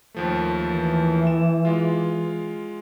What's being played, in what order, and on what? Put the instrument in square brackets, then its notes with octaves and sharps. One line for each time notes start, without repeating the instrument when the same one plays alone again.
[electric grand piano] D#2 F3 A3
[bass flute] E3
[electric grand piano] E7
G#3 F4